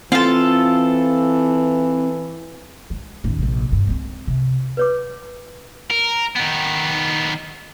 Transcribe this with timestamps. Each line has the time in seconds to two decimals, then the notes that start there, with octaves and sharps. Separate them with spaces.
0.12 E3 C4 F4 A4
2.90 G#3
3.24 A1 D#2
3.39 A#1 C3
3.71 D2 G2
3.87 G#3 C4
4.27 C3
4.77 B4 C#5 D6
5.90 A#4
6.36 D#3 B3